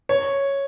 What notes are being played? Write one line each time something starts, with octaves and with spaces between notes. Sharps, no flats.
C#5